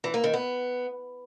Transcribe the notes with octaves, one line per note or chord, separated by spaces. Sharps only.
E3
A#3
D#3
B3